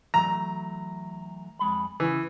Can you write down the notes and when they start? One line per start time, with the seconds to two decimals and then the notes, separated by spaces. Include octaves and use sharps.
0.14 E3 F#3 A3 A#5
1.59 F2 G#3 B5
2.00 C#3 E3